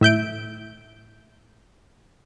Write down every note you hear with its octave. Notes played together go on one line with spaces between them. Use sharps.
A2 E5 G6 D7